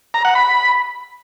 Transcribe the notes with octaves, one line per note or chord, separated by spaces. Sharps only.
A#5
F#5
B5